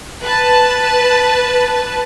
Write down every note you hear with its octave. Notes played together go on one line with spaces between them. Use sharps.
B4 A5